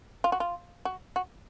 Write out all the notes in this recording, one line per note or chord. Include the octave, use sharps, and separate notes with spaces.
F4
F#4
F4
F#4
F#4